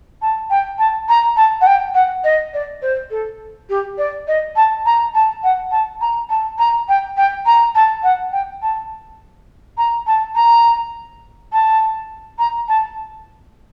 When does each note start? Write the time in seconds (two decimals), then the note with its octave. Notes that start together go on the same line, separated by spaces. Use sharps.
0.22 A5
0.50 G5
0.79 A5
1.09 A#5
1.37 A5
1.61 F#5
1.67 G5
1.95 F#5
2.24 D#5
2.54 D5
2.82 C5
3.11 A4
3.70 G4
3.98 D5
4.28 D#5
4.56 A5
4.86 A#5
5.15 A5
5.44 F#5
5.71 A5
6.01 A#5
6.30 A5
6.58 A#5
6.89 G5
7.17 G5
7.46 A#5
7.75 A5
8.03 F#5
8.32 G5
8.62 A5
9.78 A#5
10.07 A5
10.35 A#5
11.53 A5
12.39 A#5
12.68 A5